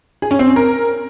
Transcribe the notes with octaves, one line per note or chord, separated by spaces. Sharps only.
G#4
C#4
C4
C#4
A#4